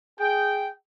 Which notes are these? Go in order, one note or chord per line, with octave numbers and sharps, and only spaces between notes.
G#4 G5